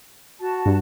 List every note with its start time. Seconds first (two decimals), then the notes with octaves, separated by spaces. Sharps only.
0.40 F#4 A5
0.66 G2